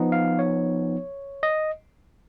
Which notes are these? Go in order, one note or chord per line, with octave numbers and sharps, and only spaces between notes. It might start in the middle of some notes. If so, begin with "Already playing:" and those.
Already playing: F3 B3 D#4
F5
C#5
D#5